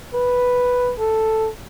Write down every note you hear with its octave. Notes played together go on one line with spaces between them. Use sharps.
B4
A4